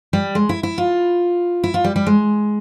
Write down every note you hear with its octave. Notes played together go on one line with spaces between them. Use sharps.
G3
G#3
E4
E4
F4
E4
F4
G3
G3
G#3